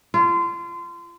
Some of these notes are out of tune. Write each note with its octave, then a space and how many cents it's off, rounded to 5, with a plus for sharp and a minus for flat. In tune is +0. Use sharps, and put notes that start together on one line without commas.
F4 -30